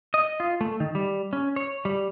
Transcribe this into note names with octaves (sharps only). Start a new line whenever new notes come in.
D#5
F4
A3
D#3
G3
C#4
C#5
G3